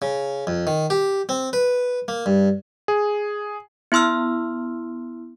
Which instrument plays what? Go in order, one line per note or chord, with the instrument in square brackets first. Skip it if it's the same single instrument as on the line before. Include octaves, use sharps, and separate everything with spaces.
[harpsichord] C#3
F2
D#3
G4
C4
B4
A#3
G2
[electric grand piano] G#4
[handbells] B3 E4 C6 E6 F6